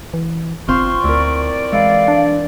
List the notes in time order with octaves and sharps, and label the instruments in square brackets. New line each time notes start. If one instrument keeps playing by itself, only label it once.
[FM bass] E3
[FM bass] G1 [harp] C4 F4 C5 [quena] C#6
[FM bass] D2 [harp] E4 A#4 [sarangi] D5
[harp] E3 [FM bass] G#3 [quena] F5
[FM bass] D4